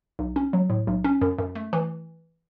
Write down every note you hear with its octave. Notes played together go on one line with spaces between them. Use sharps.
B1
C#4
F#3
A2
B1
C#4
F#2
F#2
A3
E3